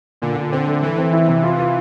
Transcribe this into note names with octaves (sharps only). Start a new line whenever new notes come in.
A#2 D3
A#2
D3 C4
A3
E3 A3
C4
E4
C3
F4
F4